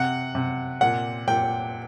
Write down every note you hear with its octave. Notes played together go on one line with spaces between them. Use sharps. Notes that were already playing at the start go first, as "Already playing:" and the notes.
Already playing: C3 F#5
C3
A#2 F#5
A#2 G5